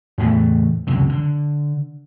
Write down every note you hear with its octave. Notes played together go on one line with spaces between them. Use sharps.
E2 A2 E3 A3
C#2 F#2 C3
D3